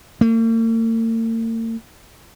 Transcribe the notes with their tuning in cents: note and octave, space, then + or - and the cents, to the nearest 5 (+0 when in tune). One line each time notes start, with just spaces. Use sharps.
A#3 -45